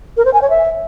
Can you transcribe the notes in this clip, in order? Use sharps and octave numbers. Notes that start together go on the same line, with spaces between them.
A#4
C5
G#5
C#5
E5